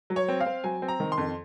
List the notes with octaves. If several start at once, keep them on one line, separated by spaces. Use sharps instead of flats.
F#3
C#5
C4
F5
C4
F#3 G#5
C4
A#5
D#3
C6
F2